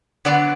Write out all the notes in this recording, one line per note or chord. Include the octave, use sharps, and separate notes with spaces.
D3 F#3 B3 D4 D5